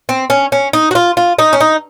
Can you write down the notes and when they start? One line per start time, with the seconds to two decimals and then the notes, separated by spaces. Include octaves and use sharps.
0.09 C4
0.30 C#4
0.52 C#4
0.73 D#4
0.91 F#4
0.95 F4
1.17 F4
1.39 D#4
1.53 C#4
1.60 D#4